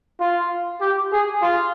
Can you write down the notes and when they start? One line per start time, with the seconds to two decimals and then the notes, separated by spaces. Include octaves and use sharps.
0.20 F4
0.81 G4
1.12 G#4
1.42 F4